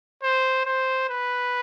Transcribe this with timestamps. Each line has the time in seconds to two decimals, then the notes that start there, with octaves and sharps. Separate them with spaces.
0.22 C5
0.65 C5
1.09 B4